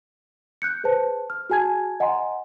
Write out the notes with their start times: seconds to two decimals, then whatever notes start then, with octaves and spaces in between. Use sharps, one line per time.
0.62 F#6 G6 C#7
0.84 G#4 B4 C5 A5
1.30 F6
1.50 F#4 G#4 G#5 A5 G#6
2.00 D#5 F#5 G#5 A#5 C6